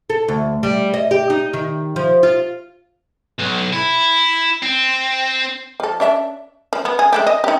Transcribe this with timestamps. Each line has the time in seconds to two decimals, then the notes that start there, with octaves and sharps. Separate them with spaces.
0.10 A4
0.28 D2
0.63 G3
0.94 D#5
1.11 G4
1.30 D#4
1.53 D#3
1.96 F3
2.23 F4
3.38 B1
3.73 E4
4.63 C4
5.80 F3 A4
6.00 C#4 D4 E5
6.73 F3
6.85 B3
6.99 G#4
7.13 G#3 A3 G4
7.27 D#5
7.44 D#4 G4